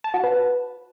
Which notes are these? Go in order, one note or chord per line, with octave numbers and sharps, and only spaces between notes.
A5
F#4
B4